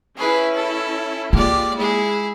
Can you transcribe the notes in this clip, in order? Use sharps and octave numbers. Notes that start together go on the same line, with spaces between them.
C#4 E4 G#4 B4
A4
G#3 A#3 F4 G4 D5
G#3 E4 G#4